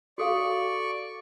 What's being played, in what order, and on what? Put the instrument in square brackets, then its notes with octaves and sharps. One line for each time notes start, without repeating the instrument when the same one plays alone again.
[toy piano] F#4 A4 F5 [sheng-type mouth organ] D5 C#6